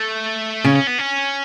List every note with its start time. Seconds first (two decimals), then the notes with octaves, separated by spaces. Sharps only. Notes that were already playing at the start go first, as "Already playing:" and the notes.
Already playing: A3
0.64 C#3 C#4
0.75 C#4
0.87 B3
0.98 C#4